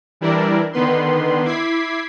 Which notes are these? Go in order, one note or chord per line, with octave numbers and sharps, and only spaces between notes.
E3 G3 D4 E4 A#4 D5
D3 D#3 B3 B4 C6
E4 D6 G#6 B6 C7